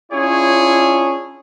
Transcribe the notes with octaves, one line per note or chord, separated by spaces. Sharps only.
C#4 D4 E4 F4 G#4 C#5